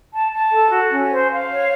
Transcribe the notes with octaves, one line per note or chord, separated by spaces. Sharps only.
A5
A5
A4
F#4
C#4
C5
F5
C#5